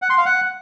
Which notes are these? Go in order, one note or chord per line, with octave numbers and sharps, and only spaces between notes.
F#5
C6
F5
F#5